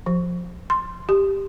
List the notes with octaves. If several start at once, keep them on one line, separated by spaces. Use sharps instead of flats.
F3
C6
G4